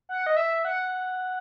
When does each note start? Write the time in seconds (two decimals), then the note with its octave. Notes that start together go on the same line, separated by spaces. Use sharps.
0.09 F#5
0.26 D#5
0.37 E5
0.65 F#5